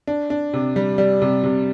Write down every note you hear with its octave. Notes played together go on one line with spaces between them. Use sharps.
D4
D4
C3
G3
G3
C3
C3